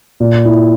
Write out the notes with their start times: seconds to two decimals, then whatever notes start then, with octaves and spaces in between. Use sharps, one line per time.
0.20 A#2
0.45 E4